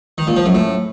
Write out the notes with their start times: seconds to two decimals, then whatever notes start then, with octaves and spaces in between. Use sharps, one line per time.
0.18 D#3
0.27 A#2
0.36 F3
0.45 F#2
0.55 A2